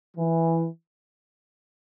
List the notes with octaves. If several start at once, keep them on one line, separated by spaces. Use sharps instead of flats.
E3